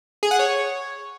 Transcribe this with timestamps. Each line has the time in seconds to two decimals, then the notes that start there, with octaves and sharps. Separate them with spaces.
0.23 G#4
0.31 F#5
0.39 C#5